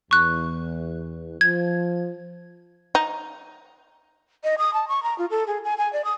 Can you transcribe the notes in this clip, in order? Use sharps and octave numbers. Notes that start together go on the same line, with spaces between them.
E2 C#6 F#6
F3 G#6
D#4
D#5
D#6
A5
C#6
A#5
F4
A4
G#4
G#5
G#5
D5
D#6